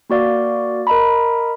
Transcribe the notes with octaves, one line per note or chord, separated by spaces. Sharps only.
A#3 F#4 D5 F5
A#4 D#5 A#5 B5